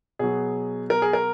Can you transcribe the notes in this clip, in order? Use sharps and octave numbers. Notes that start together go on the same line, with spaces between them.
B2 F#3 G#4
A#4
G#4
A#4